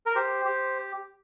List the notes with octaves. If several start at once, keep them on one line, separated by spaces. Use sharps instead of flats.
A#4
G4 C5
G4